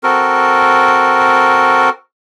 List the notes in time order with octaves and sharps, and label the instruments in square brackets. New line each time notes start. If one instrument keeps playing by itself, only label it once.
[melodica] C4 F#4 A4 A#4